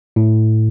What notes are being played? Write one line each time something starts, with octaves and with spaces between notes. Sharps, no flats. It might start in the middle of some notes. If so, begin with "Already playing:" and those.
A2